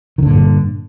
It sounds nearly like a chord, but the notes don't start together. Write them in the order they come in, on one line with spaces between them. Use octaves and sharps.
D#3 D3 A#2 G2